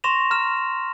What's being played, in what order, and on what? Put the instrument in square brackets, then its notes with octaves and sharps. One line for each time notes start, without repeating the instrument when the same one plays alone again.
[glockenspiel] C6 C#6 A#6 E7 F7
A#5 F6 E7